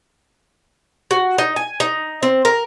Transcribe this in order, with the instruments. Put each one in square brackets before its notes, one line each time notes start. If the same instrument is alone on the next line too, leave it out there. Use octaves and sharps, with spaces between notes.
[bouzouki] F#4
D#4
G#5
D#4
C4
A#4